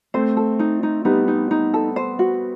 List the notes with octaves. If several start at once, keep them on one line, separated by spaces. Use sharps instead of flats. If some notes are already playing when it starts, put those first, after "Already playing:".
A3 C4 C5
A4
D#4
D#4
G3 B3 D#4
D#4
D#4
A4
C5
F#4